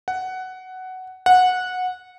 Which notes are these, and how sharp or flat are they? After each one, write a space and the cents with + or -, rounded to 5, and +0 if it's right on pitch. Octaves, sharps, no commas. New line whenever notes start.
F#5 +10
F#5 -15